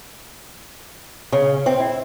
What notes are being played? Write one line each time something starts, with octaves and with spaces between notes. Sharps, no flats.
C#3
C4
E4